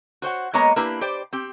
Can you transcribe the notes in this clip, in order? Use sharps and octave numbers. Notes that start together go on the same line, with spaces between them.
F#4 C5 C#5 F#5
G#3 A#3 B3 C#5 D#5 A#5
A#3 D4 E4 G4 B4
G4 C5 D5
C4 G4